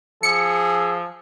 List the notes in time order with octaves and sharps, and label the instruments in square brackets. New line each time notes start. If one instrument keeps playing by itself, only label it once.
[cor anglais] F3 [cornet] G#4 [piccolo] E6 [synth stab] C#7